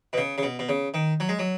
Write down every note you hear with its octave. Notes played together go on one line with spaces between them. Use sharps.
B2
C#3
C#3
B2
B2
C#3
D#3
F#3
G#3
F#3